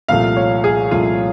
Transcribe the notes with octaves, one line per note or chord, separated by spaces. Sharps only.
C2 A#2 F3 A3 F5
C#5
G#4
C2 A#2 F3 A3 F4